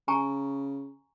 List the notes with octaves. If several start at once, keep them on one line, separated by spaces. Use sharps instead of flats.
C#3 G#5 A#5 C#6